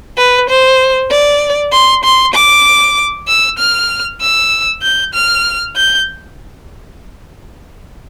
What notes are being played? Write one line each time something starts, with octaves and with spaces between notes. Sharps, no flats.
B4
C5
D5
C6
C6
D6
E6
F6
E6
G6
F6
G6